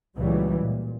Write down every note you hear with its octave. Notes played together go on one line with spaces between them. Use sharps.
C#2 A#2 E3 F#3 G3
A#2